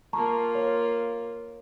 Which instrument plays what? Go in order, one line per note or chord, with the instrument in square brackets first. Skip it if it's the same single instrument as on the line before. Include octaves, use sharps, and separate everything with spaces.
[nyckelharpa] A#3 F4 [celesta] A5 A#5 C#6
[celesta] C#5